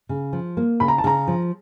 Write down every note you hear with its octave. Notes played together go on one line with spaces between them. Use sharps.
C#3
F3
A#3
C#3 B5
A#5
A5
C#3 A#5
F3